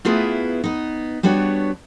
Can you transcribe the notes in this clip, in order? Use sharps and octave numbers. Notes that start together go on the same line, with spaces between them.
A3 B3 E4 F4 G#4 B4
B3 D#4
G3 B3 D4 F#4 C#5